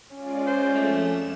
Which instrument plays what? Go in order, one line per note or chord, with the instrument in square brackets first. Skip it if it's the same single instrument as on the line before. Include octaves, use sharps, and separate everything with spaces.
[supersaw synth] G#3 F4 D5 [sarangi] C#4
[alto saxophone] C5
[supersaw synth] F2 E7 [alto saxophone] A3